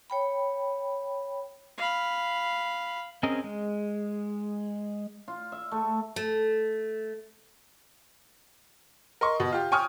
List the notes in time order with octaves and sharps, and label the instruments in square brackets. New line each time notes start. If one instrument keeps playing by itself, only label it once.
[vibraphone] C#5 G5 B5
[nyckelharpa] F5 B5
[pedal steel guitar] C4 C#4 G#4 A#4 D#5
G#3
[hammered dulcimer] F4
E5
A3
[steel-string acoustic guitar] A3
[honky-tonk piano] A#4 D#5 C6 C#6
B2
F4 G4
G5 G#5 C#6 D#6 F6